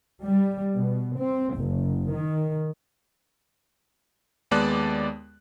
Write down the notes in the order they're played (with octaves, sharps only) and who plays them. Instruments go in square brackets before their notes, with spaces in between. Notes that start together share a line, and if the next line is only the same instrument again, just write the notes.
[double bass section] G3
B2
C4
F#1
D#3
[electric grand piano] D#2 G#3 B3 D5 A5 F#6